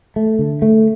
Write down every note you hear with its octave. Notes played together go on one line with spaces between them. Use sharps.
A3
D3
A3